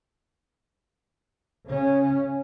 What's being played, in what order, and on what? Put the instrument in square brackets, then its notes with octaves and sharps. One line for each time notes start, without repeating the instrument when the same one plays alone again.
[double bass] C#3 C#4